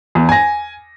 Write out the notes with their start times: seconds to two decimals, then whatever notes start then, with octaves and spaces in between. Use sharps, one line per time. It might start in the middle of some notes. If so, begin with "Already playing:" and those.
0.15 E2
0.29 G#5 A#6